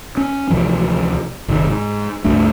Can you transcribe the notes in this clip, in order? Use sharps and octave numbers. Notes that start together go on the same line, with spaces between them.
C#4
D2 C3 E3 F3
F#1 C3 D#3
G#2
C#2 G2 A3 D4